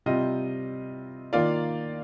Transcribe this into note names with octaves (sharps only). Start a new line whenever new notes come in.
C3 G3 C4 F4 D#5
D#3 A#3 F4 D5 F5